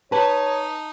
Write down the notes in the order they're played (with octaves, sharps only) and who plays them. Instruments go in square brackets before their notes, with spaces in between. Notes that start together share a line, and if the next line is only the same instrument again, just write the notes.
[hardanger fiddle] D#4 [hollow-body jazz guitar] B4 [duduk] C#5 [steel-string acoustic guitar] A5